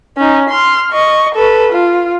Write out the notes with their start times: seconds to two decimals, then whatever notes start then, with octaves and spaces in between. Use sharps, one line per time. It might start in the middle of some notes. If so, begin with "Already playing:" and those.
0.17 C#4 D#4
0.50 C6 F6
0.92 D#5 C#6
1.35 A4 B4
1.72 F4